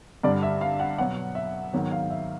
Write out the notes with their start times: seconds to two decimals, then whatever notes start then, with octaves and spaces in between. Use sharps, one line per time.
0.23 G2 D3 G3 D5
0.43 E5
0.61 F5
0.80 F#5
0.98 B2 F#3 B3 F#5
1.35 E5
1.73 G#2 D#3 F#3 B3
1.92 F5
2.10 E5